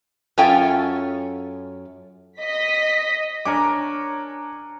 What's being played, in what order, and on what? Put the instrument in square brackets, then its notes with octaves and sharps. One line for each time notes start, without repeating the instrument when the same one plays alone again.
[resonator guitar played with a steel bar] F#2 C#4 F4 A4 G5 G#5
[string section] D#5 B6
[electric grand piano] D4 D6 [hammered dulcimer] A#4 C#5 G#5